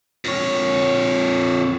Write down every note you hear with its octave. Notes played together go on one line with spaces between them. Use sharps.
F2 C#5